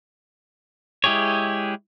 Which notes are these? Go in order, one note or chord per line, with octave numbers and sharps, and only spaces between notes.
G#3 E4 G4 G#4 C#5